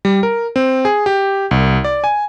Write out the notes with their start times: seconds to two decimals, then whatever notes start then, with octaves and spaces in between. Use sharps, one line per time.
0.05 G3
0.23 A#4
0.56 C4
0.85 G#4
1.06 G4
1.51 C2
1.84 D5
2.04 G#5